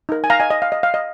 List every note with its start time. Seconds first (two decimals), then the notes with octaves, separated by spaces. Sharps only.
0.09 D#4 A#4
0.24 G#5
0.30 F5 A#5
0.40 D#5 G#5
0.50 D#5
0.62 F5
0.72 D#5
0.83 F5
0.94 D#5